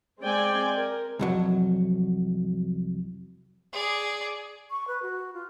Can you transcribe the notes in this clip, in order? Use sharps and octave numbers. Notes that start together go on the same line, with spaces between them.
G#3 C4 D5 G5 G#5
A#4
C2 F2 F#3
G#4 D5
C#6
B4
F#4
F4